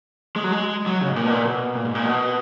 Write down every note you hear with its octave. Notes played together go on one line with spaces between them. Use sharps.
G#3
F#3
G#3
F#3
C#3
G#2
A#2
B2
A#2
B2
A#2
G#2
A#2
B2